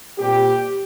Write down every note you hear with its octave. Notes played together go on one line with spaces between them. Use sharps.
A#2 G3 C4 G4